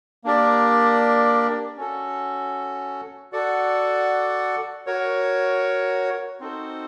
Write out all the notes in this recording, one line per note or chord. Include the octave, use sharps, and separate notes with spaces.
A#3 D4 G4 A#4 D5
C#4 F#4 A4
F#4 A4 D5 F#5
F#4 A#4 C#5
C4 D#4 F#4 A4 C5